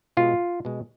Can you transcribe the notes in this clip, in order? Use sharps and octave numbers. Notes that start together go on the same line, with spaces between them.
B2 G#3 F4
B2 G#3